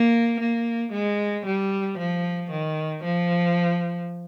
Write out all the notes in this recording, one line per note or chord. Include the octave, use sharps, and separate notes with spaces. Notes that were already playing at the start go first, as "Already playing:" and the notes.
Already playing: A#3
A#3
G#3
G3
F3
D#3
F3